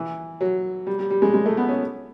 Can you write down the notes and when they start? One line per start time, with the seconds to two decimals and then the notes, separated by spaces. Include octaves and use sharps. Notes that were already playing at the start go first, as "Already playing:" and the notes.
Already playing: E3
0.41 F#3
0.87 G3
0.99 G3
1.10 G3
1.22 G#3
1.34 G#3
1.46 A3
1.57 B3
1.69 C#4